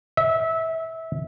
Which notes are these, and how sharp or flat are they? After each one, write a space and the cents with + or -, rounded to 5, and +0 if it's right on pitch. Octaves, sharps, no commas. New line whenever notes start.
E5 -20